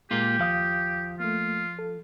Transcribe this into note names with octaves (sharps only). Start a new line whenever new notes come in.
A#2 G#3 A#3 F4 G4
D#2 F3 F5 D#6
A3 A#3 F4
A4